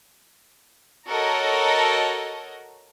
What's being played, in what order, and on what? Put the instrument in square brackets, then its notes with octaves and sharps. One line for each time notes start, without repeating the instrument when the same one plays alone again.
[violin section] F#4 A4 A#4 C#5 D#5